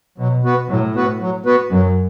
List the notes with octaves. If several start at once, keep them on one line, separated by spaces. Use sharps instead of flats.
B2 F#3
B3 F#4 B4
A2 F#3
B3 F#4 B4
F#3
B3 F#4 B4
F#2 F#3